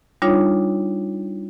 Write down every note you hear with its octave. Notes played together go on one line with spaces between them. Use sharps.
G3 D4 D#4 F4 C#5